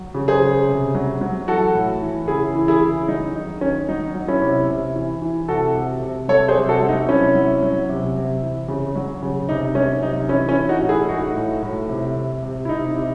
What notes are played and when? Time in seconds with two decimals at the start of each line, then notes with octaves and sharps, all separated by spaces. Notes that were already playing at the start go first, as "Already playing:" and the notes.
Already playing: F#3
0.14 C#3
0.28 G#4 C5
0.41 C#3
0.69 C3
0.95 F#3
1.21 F#3
1.48 E3 F#4 A4
1.75 A2
2.02 E3
2.28 C#3 E4 G#4
2.55 E3
2.68 E4 G#4
2.81 C#3
3.08 F#3 D#4
3.35 D#3 D#4
3.61 D#3 C#4
3.89 F#3 D#4
4.15 F#3
4.28 C#4 E4
4.42 C3
4.68 C3
4.95 E3
5.22 E3
5.48 C3 F#4 A4
5.75 C3
6.02 C3
6.28 F#3 A4 C#5
6.48 G#4 C5
6.56 C3
6.68 F#4 A4
6.83 F#3
6.89 D#4
7.09 C3 C#4 E4
7.35 F#3
7.63 F#3
7.89 C3
8.15 C3
8.42 E3
8.68 C#3
8.96 F#3
9.22 C#3
9.49 C3 D#4
9.75 F#3 C#4
10.02 C3 D#4
10.29 E3 C#4 E4
10.49 C#4 E4
10.56 E3
10.69 D#4 F#4
10.82 A2
10.89 E4 G#4
11.09 A2 D#4 F#4
11.36 A2
11.62 A2
11.89 C3
12.15 C3
12.43 C3
12.65 E4
12.69 C3 D#4
12.96 C3